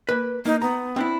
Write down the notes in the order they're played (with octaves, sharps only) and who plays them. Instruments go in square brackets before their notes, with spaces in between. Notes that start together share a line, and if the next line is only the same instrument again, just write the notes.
[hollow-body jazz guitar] A#3 B4
[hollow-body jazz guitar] A#3 [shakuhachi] D#4
[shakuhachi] B3 [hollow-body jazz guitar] A#5
[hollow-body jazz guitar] C4 D4 E4